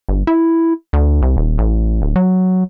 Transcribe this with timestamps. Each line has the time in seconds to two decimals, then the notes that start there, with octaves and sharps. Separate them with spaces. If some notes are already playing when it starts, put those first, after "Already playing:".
0.09 G1
0.27 E4
0.93 D2
1.22 C2
1.37 D#1
1.58 A1
2.02 D1
2.16 F#3